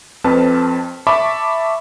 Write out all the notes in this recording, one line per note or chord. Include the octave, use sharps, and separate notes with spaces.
F2 C4 B4 A5 F6
E5 A5 B5 C#6 D6